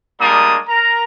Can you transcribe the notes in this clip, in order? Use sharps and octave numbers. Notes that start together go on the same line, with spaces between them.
G3 G#3 A#3 D4 A#5 D#6
A#4 A#5